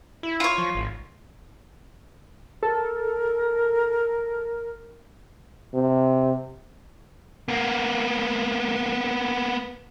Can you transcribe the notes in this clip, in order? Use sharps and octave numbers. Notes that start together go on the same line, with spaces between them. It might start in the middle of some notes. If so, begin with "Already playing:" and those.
E4
F4 C#5
F3
G#1
A4 A#4
C3
A#3 B3